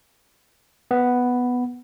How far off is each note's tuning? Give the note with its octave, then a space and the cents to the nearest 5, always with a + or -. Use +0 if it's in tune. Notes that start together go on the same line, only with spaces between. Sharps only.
B3 +0